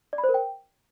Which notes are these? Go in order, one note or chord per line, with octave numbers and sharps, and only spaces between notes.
D5
B5
C5
A#4
G5